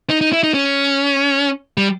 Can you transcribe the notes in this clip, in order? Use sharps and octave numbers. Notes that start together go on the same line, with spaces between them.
D#4
D#4
E4
D#4
C#4
G3